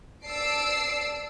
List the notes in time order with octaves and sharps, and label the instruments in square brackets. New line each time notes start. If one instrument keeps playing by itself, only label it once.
[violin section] D5 A5 E6 C7 D7